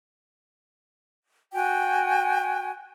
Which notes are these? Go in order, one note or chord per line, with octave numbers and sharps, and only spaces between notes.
F#4 G5 G#5